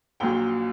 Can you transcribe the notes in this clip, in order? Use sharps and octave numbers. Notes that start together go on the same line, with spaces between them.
A#1 A#2 F#3 G5